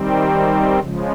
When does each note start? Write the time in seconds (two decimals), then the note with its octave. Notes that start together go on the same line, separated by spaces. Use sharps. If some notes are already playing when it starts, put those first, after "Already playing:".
Already playing: D#3 G3 C4
0.79 C#3 F3 G#3